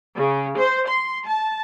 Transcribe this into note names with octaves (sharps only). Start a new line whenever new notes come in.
C#3
C5
C6
A5